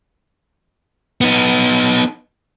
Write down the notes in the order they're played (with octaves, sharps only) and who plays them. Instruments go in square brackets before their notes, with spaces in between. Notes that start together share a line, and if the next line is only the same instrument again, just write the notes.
[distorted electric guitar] B3 D#4